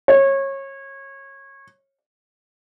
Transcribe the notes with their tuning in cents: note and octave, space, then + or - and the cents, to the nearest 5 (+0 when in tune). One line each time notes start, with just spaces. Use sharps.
C#5 -25